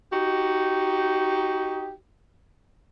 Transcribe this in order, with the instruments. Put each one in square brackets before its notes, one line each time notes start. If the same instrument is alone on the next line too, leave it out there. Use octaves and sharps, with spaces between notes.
[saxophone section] D#4 F#4 G4